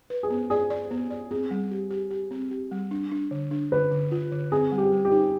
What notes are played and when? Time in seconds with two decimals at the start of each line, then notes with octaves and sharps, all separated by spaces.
0.10 B4
0.23 G#4
0.30 B3
0.50 G#4 D5
0.70 D5
0.91 B3
1.10 D5
1.31 C4 G#4
1.51 G3
1.71 G4
1.90 G4
2.11 G4
2.31 C4
2.51 G4
2.71 G3
2.91 D4
3.11 D4
3.31 D3
3.51 D4
3.72 D3 B4
3.91 D3
4.12 F4
4.32 D3
4.52 C4 G#4
4.72 G3
4.78 G4
4.92 G3
5.05 G4
5.12 D#4